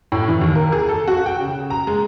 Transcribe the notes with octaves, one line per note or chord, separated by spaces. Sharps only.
A2
E3
D#2
A#4
G#4
A4
F#4
G5
C#3
A#5
G#3